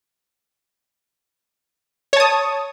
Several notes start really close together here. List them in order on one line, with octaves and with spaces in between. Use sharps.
C#5 A5 D#6